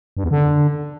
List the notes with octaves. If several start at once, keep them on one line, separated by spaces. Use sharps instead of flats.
G2
E2
D3